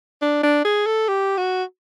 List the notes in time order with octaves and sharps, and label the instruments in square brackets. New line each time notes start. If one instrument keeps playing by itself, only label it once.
[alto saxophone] D4
D4
G#4
A4
G4
F#4